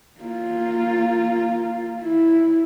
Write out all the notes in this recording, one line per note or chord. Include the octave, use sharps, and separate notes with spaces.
A#3 F4
E4